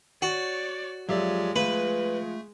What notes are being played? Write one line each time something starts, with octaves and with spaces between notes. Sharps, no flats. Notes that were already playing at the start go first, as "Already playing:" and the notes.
F#4 C#5 D5
F2 F3 F#3 G#3 G4 D5 E5
F3 A3 B4